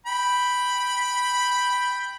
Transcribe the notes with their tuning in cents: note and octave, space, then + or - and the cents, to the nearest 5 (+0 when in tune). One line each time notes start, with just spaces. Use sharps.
G5 +0 B5 +0